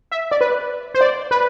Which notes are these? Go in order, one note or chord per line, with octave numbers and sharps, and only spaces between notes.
E5
D5
B4
C5
D5
B4